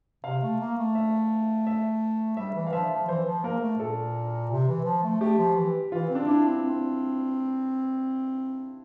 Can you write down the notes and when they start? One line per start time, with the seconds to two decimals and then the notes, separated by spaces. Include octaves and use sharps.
0.24 C3 F5
0.42 A3
0.60 A#3
0.78 A3
0.95 E5
1.67 E5
2.37 G3 E5
2.55 E3
2.67 F5
2.73 F3 E5
2.90 F3
3.08 E3 C5
3.26 F3
3.44 A#3 A#4
3.61 A3
3.79 A#2 A4
4.51 C3
4.68 E3
4.85 F3
5.03 A3
5.21 A3 G4
5.38 F3
5.56 E3
5.92 E3 F4
6.09 C4
6.15 D4
6.27 D4 E4
6.45 C4
6.63 C4